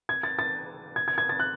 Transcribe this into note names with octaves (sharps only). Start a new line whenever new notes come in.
G#6
A6
A6
G#6
G#6
G#6
A6
F#6